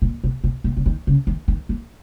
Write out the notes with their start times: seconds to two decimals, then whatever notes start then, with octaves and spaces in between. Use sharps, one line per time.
0.02 A#2
0.24 B2
0.44 B2
0.64 B2
0.77 C#3
0.86 D#3
1.07 C#3
1.27 D#3
1.48 D#3
1.69 E3